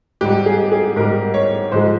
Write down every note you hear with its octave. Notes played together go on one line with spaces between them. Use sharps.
G#2 G3 G4
G#4
G#4
G#2 G3 A#4
C#5
G#2 F3 G#3 C5